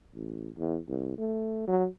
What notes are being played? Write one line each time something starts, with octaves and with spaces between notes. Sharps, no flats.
A1
E2
C2
A3
F#3